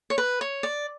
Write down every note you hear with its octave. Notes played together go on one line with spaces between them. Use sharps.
C#5
B4
C#5
D5